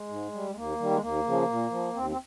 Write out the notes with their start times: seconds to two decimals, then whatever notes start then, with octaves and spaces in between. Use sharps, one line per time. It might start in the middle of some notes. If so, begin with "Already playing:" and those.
Already playing: G#3
0.09 G#2
0.32 G3
0.51 G#3
0.55 D#2 A#3
0.79 D#3 G3
0.91 G#3
1.01 D#2 A#3
1.25 C#3 F3
1.48 A#2
1.71 F3
1.94 D#2 C4
2.10 C4